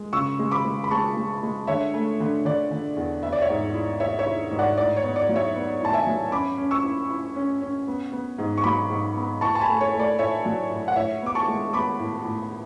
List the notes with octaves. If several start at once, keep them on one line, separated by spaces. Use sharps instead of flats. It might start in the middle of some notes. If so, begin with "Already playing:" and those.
Already playing: G#3
C#3 C#6 E6
G#3
B5 D6
G#3
B5
G#3 A5 C#6
G#3
G#3
D3 C#5 E5
A3
D3
D3 D5
D3
E2
B3 E5
D5
C#5 E5
G#2
E4
E4 C#5 E5
C#5 E5
E4
G#2
D5 F#5
A2 D5
C#5
B3
D5
F#3
C#5 E5
B3
A2 A5
E5 G#5
F#3
C#4 B5 D6
C#4
C#6 E6
E4
E4
C#4
C#4
B3
B3
G#2
C#6
F#3 B5 D6
G#2
B3
A2 A5 C#6
A5
G#5 B5
A3
C#5
A3
D5
A2 C#5 E5
F#3
A2
F#5
A2 C#5 E5
B3 D6
A5 C#6
G#3
B3 B5 D6
A2
A2